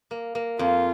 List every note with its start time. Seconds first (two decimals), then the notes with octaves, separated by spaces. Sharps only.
0.11 A#3
0.35 A#3
0.59 F2 F4